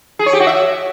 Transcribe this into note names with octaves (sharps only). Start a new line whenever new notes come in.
G#4
C#5
G4
F#4
E5